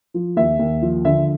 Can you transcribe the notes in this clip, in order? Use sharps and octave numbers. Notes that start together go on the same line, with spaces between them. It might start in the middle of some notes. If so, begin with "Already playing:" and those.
F3
D#2 E5
D#2
F3
D3 E5